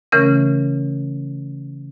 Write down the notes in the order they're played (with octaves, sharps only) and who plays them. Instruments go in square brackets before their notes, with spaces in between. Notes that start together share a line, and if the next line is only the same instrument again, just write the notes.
[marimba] C#3 E3 A3 C#4 A#4